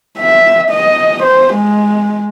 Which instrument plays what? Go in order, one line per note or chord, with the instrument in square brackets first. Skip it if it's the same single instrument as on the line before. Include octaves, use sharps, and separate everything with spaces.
[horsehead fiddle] E5
D#5
C5
G#3